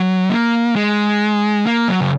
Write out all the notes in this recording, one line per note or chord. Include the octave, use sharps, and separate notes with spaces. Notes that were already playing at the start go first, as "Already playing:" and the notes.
Already playing: F#3
A#3
G#3
A#3
F#3
C#3